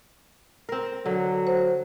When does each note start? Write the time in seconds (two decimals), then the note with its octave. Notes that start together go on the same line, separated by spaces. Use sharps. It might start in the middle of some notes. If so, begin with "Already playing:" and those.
0.69 C4 A#4
1.06 D3 F#3
1.47 C5